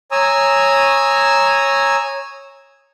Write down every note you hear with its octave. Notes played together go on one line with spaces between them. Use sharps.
C#5 G#5 A#5 D#6 E6